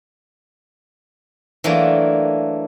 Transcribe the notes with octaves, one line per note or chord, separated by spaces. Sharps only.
E3 F#3 A3 A#3 D4 F4